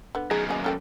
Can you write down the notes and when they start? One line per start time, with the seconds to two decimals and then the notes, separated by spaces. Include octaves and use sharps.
0.15 D3 B3
0.31 F#2 B2 D#4 G#4
0.49 C#3 A#3 G#4 D#5
0.64 C#4 A4 G5